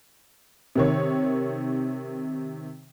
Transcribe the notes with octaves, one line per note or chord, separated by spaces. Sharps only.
C3 D#3 C#5